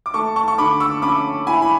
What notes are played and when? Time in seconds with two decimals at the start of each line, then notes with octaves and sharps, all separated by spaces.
0.06 D6
0.14 A3 A5 C#6
0.36 A5 C#6
0.48 C#6
0.58 D3 B5 D6
0.80 C#6 E6
1.02 C#4 B5 D6
1.47 E4 G#5 B5
1.62 B5